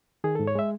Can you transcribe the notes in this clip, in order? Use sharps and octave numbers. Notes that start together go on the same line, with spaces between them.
D#3 G#4
G#2 A4
C#5
G#3 E5